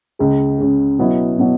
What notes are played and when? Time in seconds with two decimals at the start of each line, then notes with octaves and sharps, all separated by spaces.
0.19 C#2 C#3 G#3
0.59 C#2 C#3 G#3
0.99 B2 F#3 B3 E4
1.38 B2 F#3 B3